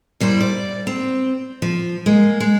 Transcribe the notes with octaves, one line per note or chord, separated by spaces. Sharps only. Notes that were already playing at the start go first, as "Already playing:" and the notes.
F#2 G3 E4 C5
D5
C4
F3
G#3 A#3
G#3